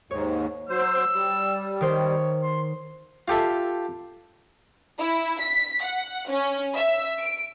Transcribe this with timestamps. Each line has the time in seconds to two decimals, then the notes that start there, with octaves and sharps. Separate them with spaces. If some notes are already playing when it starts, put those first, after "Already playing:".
0.11 D#2 G#2 C#5
0.69 F#3 C5 E6
1.13 G3
1.81 D#3 C5 C#5
2.42 C6
3.28 F4 G4 A4 E5
4.99 E4
5.41 B6
5.83 F#5
6.30 C#4
6.76 E5
7.19 D7